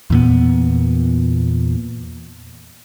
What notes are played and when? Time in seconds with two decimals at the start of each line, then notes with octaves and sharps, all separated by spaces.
0.10 E2 A#2 B3